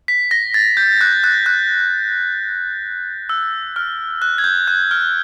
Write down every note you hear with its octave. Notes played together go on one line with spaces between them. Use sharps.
B6
A#6
A6
G6
F#6
F#6
F#6
E6
F6
F#6
G#6
G6
F#6
F6